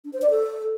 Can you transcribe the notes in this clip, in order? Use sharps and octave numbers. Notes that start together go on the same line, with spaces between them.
D4
C5
D5
A4